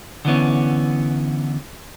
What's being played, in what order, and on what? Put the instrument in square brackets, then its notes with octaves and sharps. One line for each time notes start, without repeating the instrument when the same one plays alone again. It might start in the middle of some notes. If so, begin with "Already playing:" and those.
[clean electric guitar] D3 E3 B3 C#4